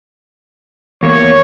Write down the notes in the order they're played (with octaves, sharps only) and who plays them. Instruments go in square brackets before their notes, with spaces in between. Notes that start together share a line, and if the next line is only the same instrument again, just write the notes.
[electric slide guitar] E2 A#3 [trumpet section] C#5